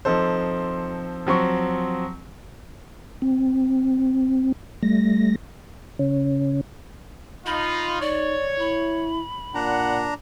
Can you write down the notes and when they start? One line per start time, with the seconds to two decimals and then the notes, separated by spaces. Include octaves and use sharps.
0.05 F3 C4 D#4 A4 C5
1.27 F3 F#3 C4 C#6
3.22 C4
4.83 G3 A3 A#6
5.99 C#3 C#4
7.46 D#4 F4 B5
8.01 D#4 C#5 D5
8.60 E4 B5
9.55 A#2 D4 F#5 A#5